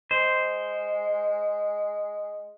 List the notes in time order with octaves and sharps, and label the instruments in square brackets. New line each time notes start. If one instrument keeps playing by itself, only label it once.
[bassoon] G#3 [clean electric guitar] C5